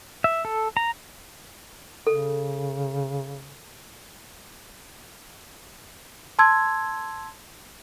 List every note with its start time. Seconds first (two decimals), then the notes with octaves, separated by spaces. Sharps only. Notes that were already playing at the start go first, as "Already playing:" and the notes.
0.24 E5
0.45 A4
0.77 A#5
2.07 C#3 A4
6.39 A5 C6 E6 G#6